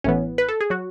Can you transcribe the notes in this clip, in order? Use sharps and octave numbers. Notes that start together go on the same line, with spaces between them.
A1 A2 E3 B3 C#4
B4
A4
G#4
F#3 F#4